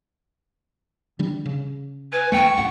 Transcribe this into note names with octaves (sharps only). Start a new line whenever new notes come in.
D3 G3 D4
C#3
B4 G#5
D#2 A3 G5 C#6
C2 F#2 A2 F#5